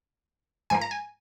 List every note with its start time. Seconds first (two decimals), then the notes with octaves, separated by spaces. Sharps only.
0.70 G#2 F3 A#3 G#5
0.81 A#5
0.91 G#5